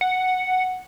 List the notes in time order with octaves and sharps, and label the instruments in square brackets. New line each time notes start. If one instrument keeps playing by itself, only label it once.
[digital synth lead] F#5